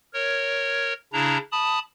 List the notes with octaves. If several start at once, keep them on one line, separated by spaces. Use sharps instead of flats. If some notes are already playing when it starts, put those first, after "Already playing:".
A#4 C#5
C#3 D4 E4 A#5
A5 B5 D#6